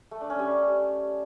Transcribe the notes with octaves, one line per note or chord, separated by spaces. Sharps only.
A3
D4
C#4
G3